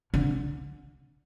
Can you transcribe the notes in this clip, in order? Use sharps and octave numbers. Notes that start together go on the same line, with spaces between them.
D3